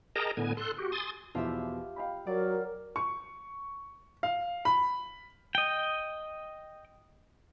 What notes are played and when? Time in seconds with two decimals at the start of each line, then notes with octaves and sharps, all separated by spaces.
0.16 G#4 A#4 D#5 G5 A5 A#5
0.37 A2 D3 B3 G#5
0.57 A4 C6 F#6
0.78 F#4 G4
0.92 G#5 C6 D#6 A6
1.35 E2 B2 F3 F4 G4 E5
1.96 F5 G5 B5
2.27 F#3 A#4 D5
2.96 C#6
4.23 F5
4.65 B5
5.55 D#5 G5